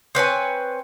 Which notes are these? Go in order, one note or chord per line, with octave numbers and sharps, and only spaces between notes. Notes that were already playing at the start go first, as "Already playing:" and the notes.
C4 B4 C#5 G#5